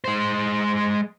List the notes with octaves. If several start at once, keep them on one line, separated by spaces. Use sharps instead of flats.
G#3 C5